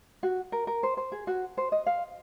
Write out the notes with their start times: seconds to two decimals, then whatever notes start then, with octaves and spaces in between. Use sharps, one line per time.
0.23 F#4
0.52 A#4
0.67 A#4
0.83 C5
0.97 C5
1.12 G#4
1.27 F#4
1.57 C5
1.72 D#5
1.86 F5